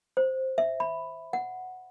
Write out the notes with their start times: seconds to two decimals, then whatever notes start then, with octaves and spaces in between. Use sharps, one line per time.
0.17 C5
0.58 E5
0.80 B5
1.33 F#5